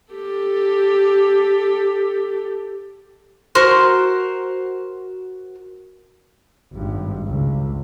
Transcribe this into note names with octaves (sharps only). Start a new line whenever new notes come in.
G4 A4
F#4 A#4 C5 F6
G#1 G2
C#2